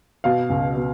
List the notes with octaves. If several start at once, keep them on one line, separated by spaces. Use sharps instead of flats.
B2 F5
C#2
B2